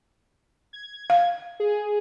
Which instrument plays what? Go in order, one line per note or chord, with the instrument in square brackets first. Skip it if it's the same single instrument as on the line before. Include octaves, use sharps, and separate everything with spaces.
[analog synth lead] G#6
[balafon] F5
[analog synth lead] G#4